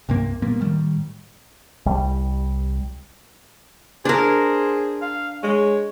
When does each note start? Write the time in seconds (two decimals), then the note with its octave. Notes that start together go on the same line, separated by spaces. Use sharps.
0.09 C2 G2 C3 A#3
0.42 A#2 G3 A#3 B3
0.61 A2 D#3 G3
1.86 C2 G3
4.05 D4 G#4 A#4 C5
5.01 F5
5.43 G#3 C#5